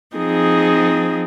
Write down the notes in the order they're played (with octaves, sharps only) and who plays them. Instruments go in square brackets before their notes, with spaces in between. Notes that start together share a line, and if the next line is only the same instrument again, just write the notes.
[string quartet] F3 C4 D#4 G#4